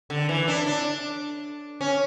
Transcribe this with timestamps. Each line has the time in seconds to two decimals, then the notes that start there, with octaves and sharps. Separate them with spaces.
0.10 D3
0.29 E3
0.48 D4
0.66 D4
1.81 C#4